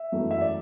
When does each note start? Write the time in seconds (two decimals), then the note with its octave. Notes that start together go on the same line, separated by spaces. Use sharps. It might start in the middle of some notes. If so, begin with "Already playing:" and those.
Already playing: E5
0.12 F#2 E3 A3
0.31 E5
0.41 D5